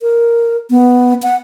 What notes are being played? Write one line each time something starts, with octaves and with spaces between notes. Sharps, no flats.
A#4
B3
F#5